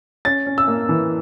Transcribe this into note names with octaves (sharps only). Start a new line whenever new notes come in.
C#4 A6
C#4
E6
A#3
E3